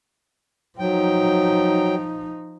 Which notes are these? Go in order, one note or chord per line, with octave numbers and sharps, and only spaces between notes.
F3 F#3 D#4 G5